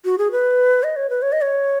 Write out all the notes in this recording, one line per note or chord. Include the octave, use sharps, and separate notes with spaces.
F#4
G#4
B4
D#5
C#5
B4
C#5
D#5
C#5